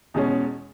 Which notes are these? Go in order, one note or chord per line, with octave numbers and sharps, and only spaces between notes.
E2 B2 G#3 C#4